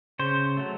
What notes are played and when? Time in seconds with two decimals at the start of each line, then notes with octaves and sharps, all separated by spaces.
0.19 C#3 C5
0.57 F#3 A3